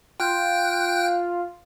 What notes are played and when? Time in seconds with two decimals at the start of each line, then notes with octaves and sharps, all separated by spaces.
0.20 F4 G5 F#6 G6